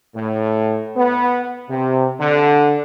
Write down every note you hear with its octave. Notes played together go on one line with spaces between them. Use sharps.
A2
B3
C3
D3